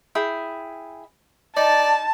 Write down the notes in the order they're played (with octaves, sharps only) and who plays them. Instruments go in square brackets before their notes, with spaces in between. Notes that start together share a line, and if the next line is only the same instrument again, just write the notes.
[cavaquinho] E4 G#4 G5
[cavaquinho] D#4 [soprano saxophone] D5 [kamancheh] A5